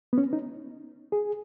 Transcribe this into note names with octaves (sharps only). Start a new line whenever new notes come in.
B3
C#4
D#4
G#4